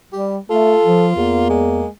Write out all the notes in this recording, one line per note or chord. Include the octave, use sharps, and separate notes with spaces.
G3 G4
A3 F4 A4
F3
E2 A#3
G#3